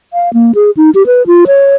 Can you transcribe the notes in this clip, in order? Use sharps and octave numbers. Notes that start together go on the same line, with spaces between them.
F5
A#3
G#4
D#4
G4
B4
F4
C#5